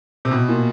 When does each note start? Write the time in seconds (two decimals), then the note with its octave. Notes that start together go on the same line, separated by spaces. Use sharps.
0.25 C3
0.31 B2
0.48 A#2